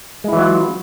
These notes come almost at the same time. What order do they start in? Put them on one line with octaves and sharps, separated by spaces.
G#3 E4 E3 F#3 F4